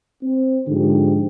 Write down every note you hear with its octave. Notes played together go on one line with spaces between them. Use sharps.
C4
G#2 D3 F3 G4